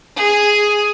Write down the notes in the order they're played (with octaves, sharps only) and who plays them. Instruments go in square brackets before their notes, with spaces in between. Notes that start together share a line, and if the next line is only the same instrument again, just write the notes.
[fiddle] G#4